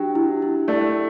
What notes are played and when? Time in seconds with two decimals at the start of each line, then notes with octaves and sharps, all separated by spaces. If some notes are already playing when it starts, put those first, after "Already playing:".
Already playing: F#3 D4 G4 G5
0.15 E4
0.42 E4
0.68 A3 D5